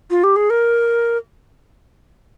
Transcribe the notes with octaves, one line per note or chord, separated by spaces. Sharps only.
F4
G4
G#4
A#4